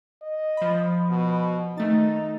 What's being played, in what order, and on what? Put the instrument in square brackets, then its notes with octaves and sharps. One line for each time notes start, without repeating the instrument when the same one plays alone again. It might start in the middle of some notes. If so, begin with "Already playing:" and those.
[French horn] D#5
[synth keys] F3 B5
[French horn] B2
[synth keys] D#3 A3 A6 [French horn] D#4